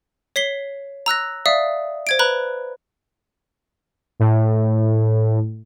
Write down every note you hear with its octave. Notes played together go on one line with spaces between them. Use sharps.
C#5 B6 C7 G7
A#5 E6 F#6 A#6
D5 E5 F5 D#6
C5 G#6 D7
B4 A#5 B5 F#6
A2